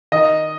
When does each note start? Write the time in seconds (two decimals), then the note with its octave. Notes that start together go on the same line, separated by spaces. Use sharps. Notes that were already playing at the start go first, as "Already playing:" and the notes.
0.12 D#3 D#5